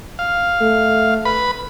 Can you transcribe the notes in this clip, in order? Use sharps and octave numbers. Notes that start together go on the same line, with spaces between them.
F5
A3
B4 B5